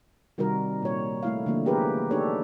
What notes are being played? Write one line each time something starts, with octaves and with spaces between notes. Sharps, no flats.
C3 D#3 G3 F#4 A#4
A#2 C#5
A3 E4 F5
D3 F3 A3 A#3 D4
E3 B3 G4 G#4 A#4 B4
D4 D#4 G4 A4 C#5